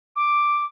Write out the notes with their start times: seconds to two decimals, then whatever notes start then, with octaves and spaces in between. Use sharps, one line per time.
0.16 D6